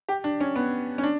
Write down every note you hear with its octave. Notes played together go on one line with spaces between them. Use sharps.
G4
D4
C#4
B3
C#4
D4